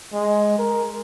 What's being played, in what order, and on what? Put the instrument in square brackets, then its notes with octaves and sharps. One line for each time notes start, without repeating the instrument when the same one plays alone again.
[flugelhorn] G#3
A#4